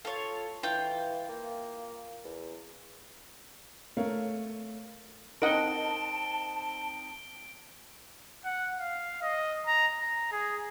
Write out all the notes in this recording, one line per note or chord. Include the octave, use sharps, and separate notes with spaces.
F4 A4 C#5
E3 F4 G5
A#3
E2
A3 A#4 C#5 F5
C4 D#4 A#4 D#5 F#5 A5 D7 G7
F#5
F5
D#5
A#5
A#5
G#4